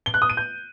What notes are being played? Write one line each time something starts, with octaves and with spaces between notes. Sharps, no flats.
G7
F#6
D#6
D#7
G6